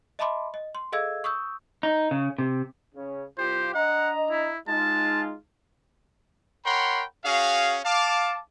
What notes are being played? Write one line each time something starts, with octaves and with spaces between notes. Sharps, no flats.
D#5 E5 A5 B5 C6 D6
D#5
C6
G#4 A4 D#5 F5 E6 G#6
C#6 D#6 E6 G6
D#4
C#3
C3
C#3 C#4
C2 F4 G4 C5
D4 D#5 F#5 A#5
E4
G#3 D#4 F4 A5
A#4 C#5 F#5 G5 B5 C6
C#4 F#4 G#4 F5
F5 A5 D6